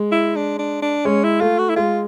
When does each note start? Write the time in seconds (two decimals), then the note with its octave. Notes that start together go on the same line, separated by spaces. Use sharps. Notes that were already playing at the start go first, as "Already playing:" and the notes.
Already playing: G#3
0.12 E4
0.36 D4
0.59 D4
0.82 D4
1.05 G#3 C#4
1.24 E4
1.41 A3 F4
1.59 F#4
1.69 E4
1.76 G#3 F4